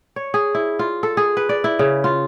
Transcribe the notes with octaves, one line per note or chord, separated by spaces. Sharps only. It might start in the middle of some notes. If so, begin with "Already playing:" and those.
C#5
G#4
E4
F4
A4
G#4
B4
D5
E4
C#3
F4